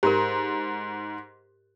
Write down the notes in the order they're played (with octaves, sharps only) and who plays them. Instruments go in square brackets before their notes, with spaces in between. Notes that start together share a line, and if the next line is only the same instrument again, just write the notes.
[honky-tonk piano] G#2 [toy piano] G4 A#4